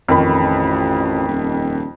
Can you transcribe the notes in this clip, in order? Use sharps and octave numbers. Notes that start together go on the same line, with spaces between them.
A1 F2 D#3 B5
D#1